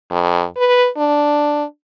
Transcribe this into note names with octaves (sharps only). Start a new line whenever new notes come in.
F2
B4
D4